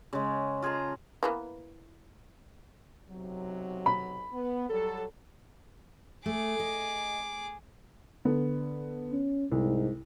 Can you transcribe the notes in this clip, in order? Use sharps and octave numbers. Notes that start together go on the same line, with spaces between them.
C#3 G#3
F4 G#4 A4 A#5
E3 A#3 B3
B1 C3 F#3
B5
B3
F#3 G3 A4
A3 G#4 D6
D#5
D3 B3
C#4
C2 G#2